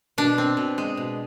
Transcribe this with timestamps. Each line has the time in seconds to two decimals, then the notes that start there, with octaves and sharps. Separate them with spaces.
0.18 B2 D4
0.38 C4
0.57 B2
0.78 G#3
0.97 B2